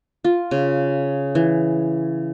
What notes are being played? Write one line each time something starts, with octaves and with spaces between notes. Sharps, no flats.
F4
C#3
E3